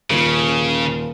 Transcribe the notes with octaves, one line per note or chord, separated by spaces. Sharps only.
D#1 C#3 F4